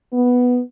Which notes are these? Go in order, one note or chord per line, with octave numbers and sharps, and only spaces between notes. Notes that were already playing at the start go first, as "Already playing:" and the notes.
B3